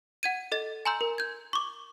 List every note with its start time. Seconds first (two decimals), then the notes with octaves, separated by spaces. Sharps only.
0.23 F#5 G#6 D#7
0.52 A4 D#5 A6
0.85 G#5 A#5 C6 E6 G6
1.01 A#4
1.18 G6 G#6
1.53 C#6 D6